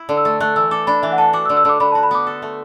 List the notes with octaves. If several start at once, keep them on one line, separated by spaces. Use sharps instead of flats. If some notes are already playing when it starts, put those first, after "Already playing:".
Already playing: E4
D3
E6
A3
A3 F#6
E3 E6
A4 D6
D4 B5
E3 E5
F#5
A4 A5
F#4 D6
E6
D3
E6
D3 D6
D3 B5
A5
F#4
B5
B3 D6
A4
A3